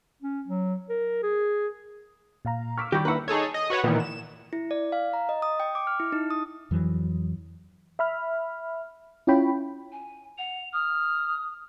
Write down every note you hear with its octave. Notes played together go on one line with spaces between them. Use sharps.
C#4
F#3
A#4
G#4
A#2 F5 A#5
C#6 D6 E6 F6 B6
D#3 G3 G4 C#6 G6 A#6
A#3 D4 E4 B4 F#5 A#5 C#6 E6
D#4 G#4 A4 C#5
D#5
F#4 B4 C#5 F#5
A#2 D#3 E3 B3
E7
E4
D5
F5
A#5
D#5
D#6
G5
D6
F6
E4
D#4
D#6
F2 E3 F#3
E5 B5 F6
C#4 E4 F4 C#5 G5 B5
G#5
F#5 F7
D#6 F6